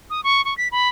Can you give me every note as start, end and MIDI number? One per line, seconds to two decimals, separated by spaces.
0.10 0.23 87
0.24 0.44 85
0.45 0.56 85
0.58 0.68 95
0.72 0.89 83